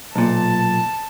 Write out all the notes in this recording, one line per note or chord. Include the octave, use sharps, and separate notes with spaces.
B1 A#2 A5